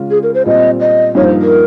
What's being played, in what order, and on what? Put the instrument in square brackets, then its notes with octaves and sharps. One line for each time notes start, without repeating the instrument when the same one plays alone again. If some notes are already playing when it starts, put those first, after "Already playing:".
Already playing: [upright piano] C#3 G#3 C#4 F4
[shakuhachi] G#4
A#4
C5
[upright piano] A#2 G3 C4 [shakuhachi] D#5
[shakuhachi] D#5
[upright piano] G2 F3 A#3 D#4 [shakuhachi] C#5
[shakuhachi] C5
A#4